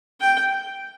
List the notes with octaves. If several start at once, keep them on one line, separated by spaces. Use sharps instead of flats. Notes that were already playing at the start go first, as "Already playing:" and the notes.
G5